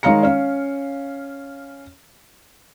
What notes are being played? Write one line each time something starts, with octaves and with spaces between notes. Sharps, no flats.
D#3 G#3 C#5 F5 A#5 C#7
C#4 F5